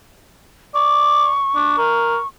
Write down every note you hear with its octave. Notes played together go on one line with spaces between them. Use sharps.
D5 C#6
D4
A#4